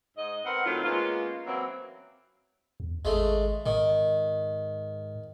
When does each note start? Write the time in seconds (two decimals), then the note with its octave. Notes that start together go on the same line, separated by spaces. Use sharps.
0.17 G#2 D#5
0.45 B3 C4 A#4 F#5
0.66 A2 D#3 F#3 C4 F4
0.85 G#3 A#3 B3 C#4 F4
1.47 E3 F#3 A#3 C4 C#4 E4
2.80 E2
3.05 G#1 G#3 A3
3.66 G#2 D#3